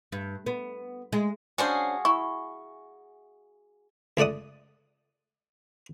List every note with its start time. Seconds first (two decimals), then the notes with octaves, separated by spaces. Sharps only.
0.12 G2
0.46 B3
1.12 G#3
1.58 C#4 D4 F#4 G#4 C5 F5
2.05 E4 C#6
4.17 C#2 A3 D5 F#5 D#6